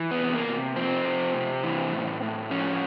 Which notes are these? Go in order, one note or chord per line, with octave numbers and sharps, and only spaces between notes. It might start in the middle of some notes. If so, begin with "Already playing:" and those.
Already playing: E3
B3
C3
A#3
C3
F3 C4
C3
C3
E3
A2
A2
F3 C#4